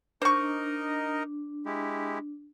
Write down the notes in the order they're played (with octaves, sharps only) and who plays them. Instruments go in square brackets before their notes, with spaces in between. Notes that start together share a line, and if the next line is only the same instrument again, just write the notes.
[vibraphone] D4 [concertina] D#4 A#4 D#5 [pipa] C5 C#6
[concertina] G#3 E4 G4